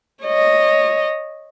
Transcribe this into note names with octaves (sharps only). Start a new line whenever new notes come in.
C#5 D#5